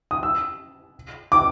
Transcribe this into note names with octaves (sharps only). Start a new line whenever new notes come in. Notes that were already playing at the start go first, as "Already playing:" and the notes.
D#6
E6
D6